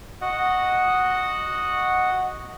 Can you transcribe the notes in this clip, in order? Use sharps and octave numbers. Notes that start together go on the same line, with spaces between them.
F#4 D#5 F#5